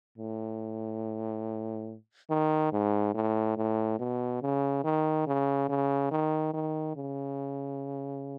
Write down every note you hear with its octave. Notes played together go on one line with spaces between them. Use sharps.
A2
D#3
G#2
A2
A2
B2
C#3
D#3
C#3
C#3
D#3
D#3
C#3